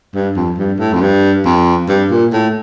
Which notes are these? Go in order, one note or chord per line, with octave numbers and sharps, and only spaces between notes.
G2
F2
G2
A2
F2
G2
F2
G2
A#2
A2